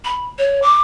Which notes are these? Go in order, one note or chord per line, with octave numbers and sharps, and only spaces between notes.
B5
C#5
D6